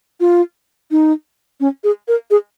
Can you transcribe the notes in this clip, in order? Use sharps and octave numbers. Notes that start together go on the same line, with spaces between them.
F4
D#4
C#4
G#4
A#4
G#4